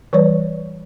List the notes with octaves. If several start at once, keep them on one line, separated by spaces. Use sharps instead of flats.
E3 G3 B4 C#5 D5